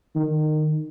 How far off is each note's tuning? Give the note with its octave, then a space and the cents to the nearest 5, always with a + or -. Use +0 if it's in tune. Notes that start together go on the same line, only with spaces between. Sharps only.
D#3 -20